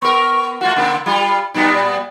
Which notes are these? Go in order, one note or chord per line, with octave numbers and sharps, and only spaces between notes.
B3 A#4 C#6
A3 F4 F#4 F#5
C#3 A#3 C4
G3 F4 B5
A#2 G3 B3 D#4
D5